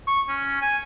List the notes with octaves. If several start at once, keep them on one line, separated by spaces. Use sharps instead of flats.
C#6
C#4
G#5